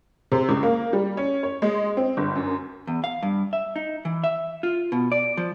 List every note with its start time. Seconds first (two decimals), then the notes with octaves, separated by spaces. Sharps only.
0.32 C3
0.49 C#2
0.63 A#3
0.93 G3
1.17 C#4
1.43 C#5
1.62 G#3
1.97 C4
2.17 G1
2.36 F#2
2.87 E2
3.04 F5
3.23 G2
3.53 E5
3.76 D#4
4.05 E3
4.24 E5
4.63 F4
4.92 B2
5.12 D5
5.37 F3